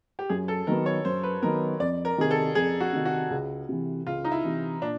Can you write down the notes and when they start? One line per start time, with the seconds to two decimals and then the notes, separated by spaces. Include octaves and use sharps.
0.19 G4
0.29 F#2 G#4
0.48 A4
0.67 D#3 F#3 B3 A#4
0.86 C#5
1.05 F#2 C5
1.23 B4
1.42 D#3 F#3 B3 A#4
1.79 F2 D5
2.05 A#4
2.18 C3 D#3 G#4
2.31 A4
2.55 F2 G#4
2.80 F#4
2.93 C3 D#3
3.05 F#4
3.30 C#2
3.69 C3 E3
4.07 C#2 F4
4.25 D#4
4.32 E4
4.45 C3 E3
4.82 A#2 D4